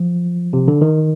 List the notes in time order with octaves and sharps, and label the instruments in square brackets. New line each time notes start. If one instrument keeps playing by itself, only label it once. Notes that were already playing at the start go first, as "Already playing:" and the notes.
Already playing: [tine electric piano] F3
C3
D3
D#3